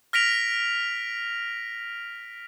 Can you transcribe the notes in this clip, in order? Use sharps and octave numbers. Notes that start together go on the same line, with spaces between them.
F6 A#6 B6 D7 F7